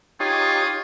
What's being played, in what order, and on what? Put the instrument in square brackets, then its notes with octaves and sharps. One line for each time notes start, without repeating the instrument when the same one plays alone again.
[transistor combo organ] D#4 G4 C#5 [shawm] F4 [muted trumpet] G#4